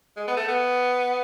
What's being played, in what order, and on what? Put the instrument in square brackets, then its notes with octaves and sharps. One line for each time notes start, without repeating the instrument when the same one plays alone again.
[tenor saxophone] G#3
B3
A3
B3